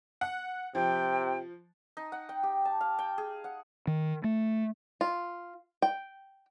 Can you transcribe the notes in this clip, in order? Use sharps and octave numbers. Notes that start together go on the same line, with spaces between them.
F#5
C3 F3 G5
D#4
F#5
G5
G4
A5
F5
G5
G#4
F#5
D#3
A3
F4
G5